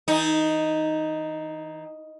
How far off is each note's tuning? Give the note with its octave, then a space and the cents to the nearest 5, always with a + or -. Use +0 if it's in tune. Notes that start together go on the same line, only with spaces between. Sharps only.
E3 -35 D#4 +0